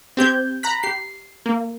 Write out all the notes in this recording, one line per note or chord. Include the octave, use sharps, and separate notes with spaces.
C4 G4 G6 G#6
A#5 B5 F#6 B6
G4 C7
A#3